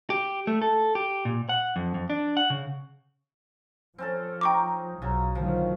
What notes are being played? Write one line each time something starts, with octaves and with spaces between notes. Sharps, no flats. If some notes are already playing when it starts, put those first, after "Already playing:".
G4
A3
A4
G4
A#2
F#5
F2
F2
D4
F#5
C#3
F3 C4 C#4 A4
D#4 G5 A#5 C#6 D6
B1 C#3 F#3
D2 D#3 F3 F#3